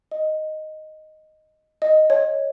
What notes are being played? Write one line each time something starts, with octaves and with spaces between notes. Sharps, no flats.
D#5
D#5
C#5